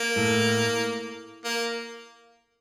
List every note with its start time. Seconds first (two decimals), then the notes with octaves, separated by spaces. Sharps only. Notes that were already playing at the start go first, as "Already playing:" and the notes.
Already playing: A#3
0.16 A2
1.44 A#3